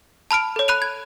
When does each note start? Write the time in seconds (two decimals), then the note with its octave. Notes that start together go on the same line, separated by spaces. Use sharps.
0.31 A5 B5 F6 D7
0.56 A4 C#5
0.68 B5 F#6 D#7 F7
0.82 G#6